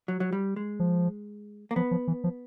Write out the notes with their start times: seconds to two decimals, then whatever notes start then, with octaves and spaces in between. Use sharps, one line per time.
0.08 F#3
0.20 F#3
0.33 G3
0.56 G#3
0.80 F3
1.71 A#3
1.76 F3 B3
1.91 F3
2.08 E3
2.24 F3